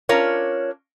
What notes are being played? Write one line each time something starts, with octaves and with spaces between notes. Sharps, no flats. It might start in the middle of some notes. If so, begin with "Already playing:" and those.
C#4 D4 F4 A#4 C#5